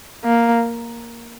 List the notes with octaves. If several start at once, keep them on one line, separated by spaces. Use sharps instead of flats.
A#3